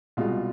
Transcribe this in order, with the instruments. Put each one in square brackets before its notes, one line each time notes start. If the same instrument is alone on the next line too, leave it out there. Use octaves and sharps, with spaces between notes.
[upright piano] C2 B2 G#3 F4